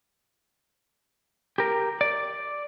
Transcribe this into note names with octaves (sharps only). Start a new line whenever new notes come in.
G4 A#4
D5